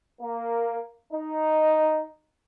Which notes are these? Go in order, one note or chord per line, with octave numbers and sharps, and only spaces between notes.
A#3
D#4